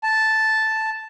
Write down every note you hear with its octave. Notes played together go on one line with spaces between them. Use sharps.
A5